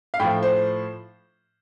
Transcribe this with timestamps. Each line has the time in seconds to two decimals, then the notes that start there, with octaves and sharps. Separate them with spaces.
0.14 F5
0.20 A2 F3 G5
0.43 C5